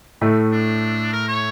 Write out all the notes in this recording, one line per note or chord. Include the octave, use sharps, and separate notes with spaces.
A2 A3
D4
A#4
C#5